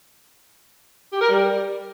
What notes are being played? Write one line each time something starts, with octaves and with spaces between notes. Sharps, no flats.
G4
A#4
G3